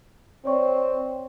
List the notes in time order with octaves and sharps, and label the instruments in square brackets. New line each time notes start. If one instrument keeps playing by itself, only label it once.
[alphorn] C4 [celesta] C#5 D5 C#6